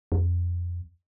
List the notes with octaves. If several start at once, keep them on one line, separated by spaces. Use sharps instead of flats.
F2